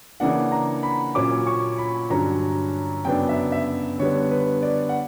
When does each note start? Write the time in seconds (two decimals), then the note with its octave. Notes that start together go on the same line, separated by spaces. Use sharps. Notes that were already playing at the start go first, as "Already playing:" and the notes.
0.20 C#3 E3 A#3 D4 F#5
0.52 A#5
0.83 B5
1.15 A#2 F#3 A#3 C#4 D6
1.47 C#6
1.78 B5
2.10 G2 D3 F#3 C#4 A#5
3.05 F#2 C#3 F#3 B3 D4 G5
3.29 E5
3.52 E5
3.99 D3 G3 B3 C#5
4.31 B4
4.63 D5
4.89 F#5